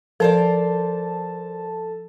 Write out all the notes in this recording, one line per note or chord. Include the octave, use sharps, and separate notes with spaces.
F3 A4 A#4 C5 D5 A5